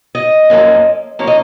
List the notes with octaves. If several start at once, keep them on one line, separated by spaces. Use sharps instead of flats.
D#5
F#2 F3 A#3 C#4
F3 A#3 C#4 C#5
D#5